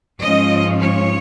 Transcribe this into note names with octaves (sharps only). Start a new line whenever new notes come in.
G#2 F3 G#3 C#4 F4 D#5
C#5